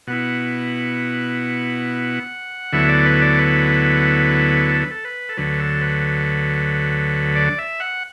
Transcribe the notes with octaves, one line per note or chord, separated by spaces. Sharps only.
B2 B3 E4 F#5
D2 D3 F#3 B3 E4 E5
D5
B4
D5
B4
A4
B4
A4
B4
A4
D2 D3 F#3 B4
A4
B4
D5
E5
F#5